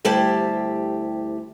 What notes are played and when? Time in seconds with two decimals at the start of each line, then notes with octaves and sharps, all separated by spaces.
0.05 D2 G3 C4 E4 G4 A5